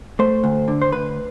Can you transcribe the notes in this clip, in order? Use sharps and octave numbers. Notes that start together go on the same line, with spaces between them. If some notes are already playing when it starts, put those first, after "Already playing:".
A3 C5
D2
D3
C5
D2 B4